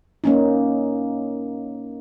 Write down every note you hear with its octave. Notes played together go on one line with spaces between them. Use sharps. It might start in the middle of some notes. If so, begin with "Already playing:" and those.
A#3 C#4 D#4